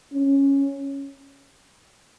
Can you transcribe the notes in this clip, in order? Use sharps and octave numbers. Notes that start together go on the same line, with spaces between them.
C#4